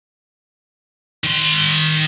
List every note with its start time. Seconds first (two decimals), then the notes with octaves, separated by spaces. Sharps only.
1.24 D#3 C6